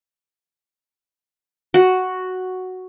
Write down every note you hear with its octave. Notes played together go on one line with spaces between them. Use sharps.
F#4